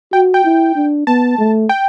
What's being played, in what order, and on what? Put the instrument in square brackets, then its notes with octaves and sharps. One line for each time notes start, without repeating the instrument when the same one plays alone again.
[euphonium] F#4 [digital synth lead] G5
[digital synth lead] G5
[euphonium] E4
D4
[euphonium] B3 [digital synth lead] A5
[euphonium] A3
[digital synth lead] G5